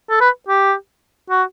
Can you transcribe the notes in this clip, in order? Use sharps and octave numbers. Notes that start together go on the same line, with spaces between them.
A4
B4
G4
F#4